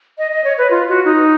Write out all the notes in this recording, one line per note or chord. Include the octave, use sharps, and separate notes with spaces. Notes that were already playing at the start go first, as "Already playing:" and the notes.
D#5
D#5
C#5
B4
F4
F#4
D#4